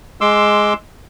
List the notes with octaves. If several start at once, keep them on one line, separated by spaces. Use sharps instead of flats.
G#3 C6 D6 E6